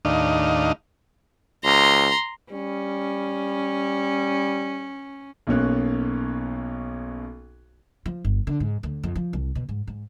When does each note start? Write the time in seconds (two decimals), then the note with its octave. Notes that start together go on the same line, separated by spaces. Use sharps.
0.05 D#2 A2 D4 D#4 D#5 F5
1.65 C#2 A#5 C6
2.53 G3 C#4
5.47 B1 B2 A#3 C#4 F#6
8.06 F3
8.25 G1
8.47 D3
8.60 G#2
8.83 D2
9.03 F2
9.15 F3
9.33 C2
9.55 B2
9.69 G#2
9.87 G#2